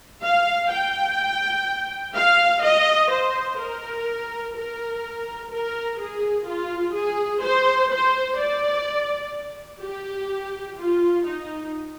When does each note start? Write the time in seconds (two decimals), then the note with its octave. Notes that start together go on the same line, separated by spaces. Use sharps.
0.23 F5
0.72 G5
2.15 F5
2.63 D#5
3.11 C5
3.60 A#4
4.55 A#4
5.52 A#4
5.99 G#4
6.46 F4
6.94 G#4
7.43 C5
7.91 C5
8.38 D5
9.82 G4
10.79 F4
11.27 D#4